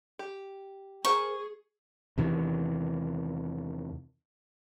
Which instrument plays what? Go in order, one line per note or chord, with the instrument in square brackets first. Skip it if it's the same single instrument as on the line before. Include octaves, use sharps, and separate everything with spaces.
[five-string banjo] G4
[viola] G#4 [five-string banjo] A#4 C5 G#5 [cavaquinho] C#6
[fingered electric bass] E2 C3 D#3 E3